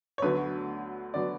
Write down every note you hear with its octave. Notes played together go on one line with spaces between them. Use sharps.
C#5
D2 D3 F#3 B3 B4
D3 F#3 B3 D5